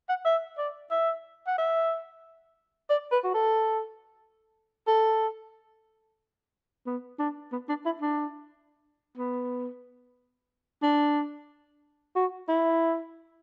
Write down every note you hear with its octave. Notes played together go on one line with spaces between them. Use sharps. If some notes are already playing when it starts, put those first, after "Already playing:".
F#5
E5
D5
E5
F#5
E5
D5
B4
F#4
A4
A4
B3
D4
B3
D4
E4
D4
B3
D4
F#4
E4